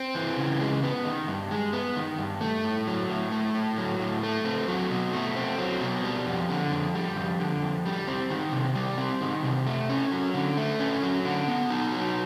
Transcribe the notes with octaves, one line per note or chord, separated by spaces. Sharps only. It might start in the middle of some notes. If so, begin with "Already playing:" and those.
Already playing: C4
E3
C#3
G#3
B3
D#3
G2
G#3
B3
D#3
G2
A3
A2
F#3
A2
A3
A2
F#3
A2
A3
C4
F#3
B2
A3
C4
F#3
B2
G3
F2
D3
F2
G3
F2
D3
F2
G3
C4
D#3
C3
G3
C4
D#3
C3
A3
C#4
F#3
D3
A3
C#4
F#3
D3
B3
D#4
F#3